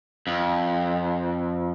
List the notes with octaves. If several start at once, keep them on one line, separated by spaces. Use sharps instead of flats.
F2